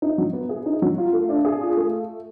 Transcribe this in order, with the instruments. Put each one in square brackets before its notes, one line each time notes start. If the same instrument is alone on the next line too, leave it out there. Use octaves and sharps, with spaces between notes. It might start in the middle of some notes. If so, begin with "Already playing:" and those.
[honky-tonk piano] D#4
F#3
B3
G#4
D#4
F#3
F4
A3
D4
G#4
F4
A3